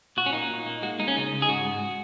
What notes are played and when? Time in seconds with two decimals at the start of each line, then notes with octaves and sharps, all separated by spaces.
0.17 A#2 F#4
0.26 C#4
0.33 A#3 D#4
0.49 A#2
0.66 A#3
0.82 G#3 F#4
0.99 G#3 D#4
1.08 C#4
1.16 C#3 D#4
1.33 C#2
1.42 G#4
1.48 G#2 F#4
1.65 G#2